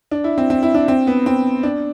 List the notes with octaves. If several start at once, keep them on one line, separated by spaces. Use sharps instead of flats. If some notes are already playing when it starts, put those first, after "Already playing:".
D4
E4
C4
C4
E4
D4
C4
B3
C4
D4